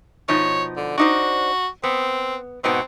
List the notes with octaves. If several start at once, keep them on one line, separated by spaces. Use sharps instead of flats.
B2 F3 D#4 C#5
D3
D4 D#4 F#4 C5
B3 C4
G#2 B2 B3 C4